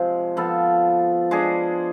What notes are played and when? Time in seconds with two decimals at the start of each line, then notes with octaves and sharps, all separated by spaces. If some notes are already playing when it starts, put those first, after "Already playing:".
Already playing: C3 F3 G#3
0.37 F3 B3 F4 A4
1.31 G#3 D4 G#4